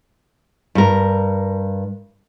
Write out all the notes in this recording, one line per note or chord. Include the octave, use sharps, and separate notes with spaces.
G2 A#4